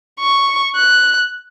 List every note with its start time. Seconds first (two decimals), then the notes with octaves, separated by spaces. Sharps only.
0.20 C#6
0.76 F#6